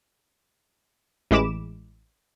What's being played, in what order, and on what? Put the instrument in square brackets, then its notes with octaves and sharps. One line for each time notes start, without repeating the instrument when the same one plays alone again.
[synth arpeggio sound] A1 E3 G#3 B5 D6 E7